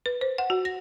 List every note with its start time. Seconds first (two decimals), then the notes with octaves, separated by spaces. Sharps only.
0.06 B4
0.21 C5
0.38 F#5
0.50 F#4
0.65 A#6